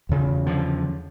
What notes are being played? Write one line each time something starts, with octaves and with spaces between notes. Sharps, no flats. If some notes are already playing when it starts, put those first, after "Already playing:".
E2 C#3
D3 F3